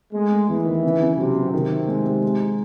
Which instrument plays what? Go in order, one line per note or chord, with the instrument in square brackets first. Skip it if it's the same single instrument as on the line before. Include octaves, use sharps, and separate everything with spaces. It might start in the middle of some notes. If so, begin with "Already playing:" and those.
[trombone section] G#3 [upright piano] A3
[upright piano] A3
[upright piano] E2 [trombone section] E3
[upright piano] D#3
C#3
C#3
[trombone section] C3 [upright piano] F#3
[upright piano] F#3
[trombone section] C3 [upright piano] D#3
[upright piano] C4
G#3
G#3
G#3
D#4